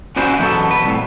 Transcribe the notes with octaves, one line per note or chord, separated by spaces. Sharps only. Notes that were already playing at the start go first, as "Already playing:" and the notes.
C#4 D4 E4 F#4 C5
E2 B2 F#3 B3 A4
B4
C2 A2